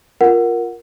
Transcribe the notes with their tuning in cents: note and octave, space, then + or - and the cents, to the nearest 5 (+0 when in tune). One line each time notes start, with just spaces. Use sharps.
F4 +0 A#4 +5 F#5 +0